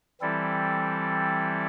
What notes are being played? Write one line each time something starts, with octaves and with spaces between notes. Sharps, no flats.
E3 G3 C4 E4 A4